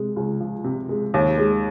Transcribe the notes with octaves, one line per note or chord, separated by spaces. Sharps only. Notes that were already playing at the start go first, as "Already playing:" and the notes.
Already playing: C3 G#3
C#2
F3
C3
G#3
D#2
G#3